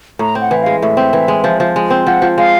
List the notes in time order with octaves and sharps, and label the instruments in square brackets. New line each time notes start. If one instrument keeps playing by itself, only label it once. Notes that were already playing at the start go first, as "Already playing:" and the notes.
[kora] A2 [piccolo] A#5
[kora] C4
[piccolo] F#5
[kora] E3
[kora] G#3 [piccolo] F5
[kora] A2 [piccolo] E5
[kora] C4
E3
G#3
F3
F3
G#3
C4
[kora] F3 [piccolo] F#5
[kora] F3
[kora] G#3 [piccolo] F5